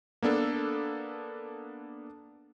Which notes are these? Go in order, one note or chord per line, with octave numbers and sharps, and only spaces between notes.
A#3 B3 D4 A4